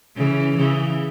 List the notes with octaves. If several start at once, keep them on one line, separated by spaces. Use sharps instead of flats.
C#3 E3
C#3 E3